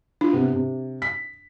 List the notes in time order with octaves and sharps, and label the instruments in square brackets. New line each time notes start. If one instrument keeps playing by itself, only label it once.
[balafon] D4 [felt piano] F4
[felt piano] C3 B3
C3
B6